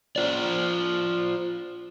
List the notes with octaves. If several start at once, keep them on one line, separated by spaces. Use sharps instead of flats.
F4 C5 D5